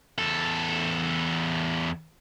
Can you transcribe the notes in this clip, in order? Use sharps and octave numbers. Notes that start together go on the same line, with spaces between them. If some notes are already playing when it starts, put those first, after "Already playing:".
E2 A4